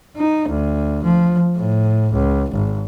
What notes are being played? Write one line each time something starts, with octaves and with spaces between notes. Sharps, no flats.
D#4
D2
F3
A2
C#2
G#1